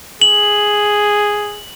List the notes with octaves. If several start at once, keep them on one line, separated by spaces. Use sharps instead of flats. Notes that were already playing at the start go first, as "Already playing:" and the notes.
G#4 F#7